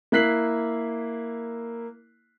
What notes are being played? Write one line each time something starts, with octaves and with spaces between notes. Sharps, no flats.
A#3 E4 F#6 B6 C7 F#7